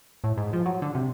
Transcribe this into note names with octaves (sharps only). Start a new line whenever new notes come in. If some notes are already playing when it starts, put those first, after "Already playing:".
A2
G#2
F3
F#3
D3
C3